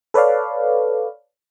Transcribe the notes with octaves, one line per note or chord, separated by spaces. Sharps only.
A4 B4 C#5 D5 F5